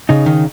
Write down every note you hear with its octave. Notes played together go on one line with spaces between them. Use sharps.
C#3 D#4
D#3